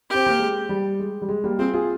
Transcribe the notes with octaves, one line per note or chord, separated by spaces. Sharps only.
C4 G4
A#3
G#3
G3
G#3
G3
G#3
G3 A#3
C4 F4 G#4
F4 G#4